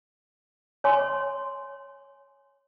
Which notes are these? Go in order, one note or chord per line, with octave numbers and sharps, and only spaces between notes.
C#5 G#5 C6